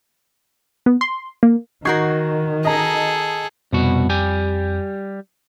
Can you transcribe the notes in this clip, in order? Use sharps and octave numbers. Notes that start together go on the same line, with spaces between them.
B3
C6
A#3
D#3 D#4 F#4 A#4 C#6 G#6 C7
G#4 A4 D#5 A#5
C2 F2 B2 F#4
G3 G4 G#5